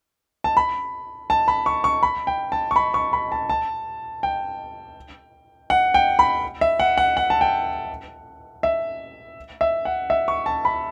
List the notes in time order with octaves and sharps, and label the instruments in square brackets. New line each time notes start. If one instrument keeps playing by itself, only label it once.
[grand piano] A5
B5
A5
B5
C#6
C#6
B5
G5
A5
C#6
B5
C#6
B5
A5
A5
G5
F#5
G5
B5
E5
F#5
F#5
F#5
A5
G5
E5
E5
F#5
E5
C#6
A5
B5